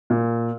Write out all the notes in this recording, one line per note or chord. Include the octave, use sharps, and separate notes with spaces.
A#2